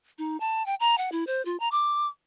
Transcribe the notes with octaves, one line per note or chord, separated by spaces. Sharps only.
D#4
A5
G5
A#5
F#5
E4
C5
F4
A#5
D6